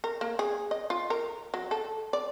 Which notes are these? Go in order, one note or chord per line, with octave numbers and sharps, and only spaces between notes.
A#4
A#3
G#4
D#5
F4
A#4
F#3
A4
D5